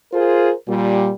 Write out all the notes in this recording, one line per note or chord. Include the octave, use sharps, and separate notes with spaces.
F4 G#4 A#4 C5
A#2 G3